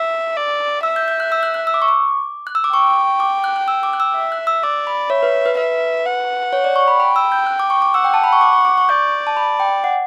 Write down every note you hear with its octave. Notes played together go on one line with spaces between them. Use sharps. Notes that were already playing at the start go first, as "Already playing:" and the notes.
Already playing: E5 E6
D5
E5 E6
G6
G6
F#6
E6
F#6
F#6
E6
D6
C#6
D6
F#6
E6
D6
G5 C#6
D6
F#6
F#6
E6
D6
F#6
E6
E5
F#6
E6
D5 D6
B5
C#5 E5
B4
B4
B4 E5
F#5
C#5
D5
C#6
B5
G5 B5
E6
G6
F#6
D6
C#6
D6
F#5 E6
G5
A5
B5
C#6
D6
C#6
D6
C#6
D5 G6
A5
B5
G5
F#5